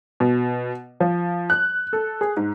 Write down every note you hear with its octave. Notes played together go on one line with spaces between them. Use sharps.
B2
F3
F#6
A4
G#4
G#2